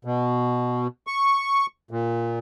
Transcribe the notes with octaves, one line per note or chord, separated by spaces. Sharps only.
B2
C#6
A#2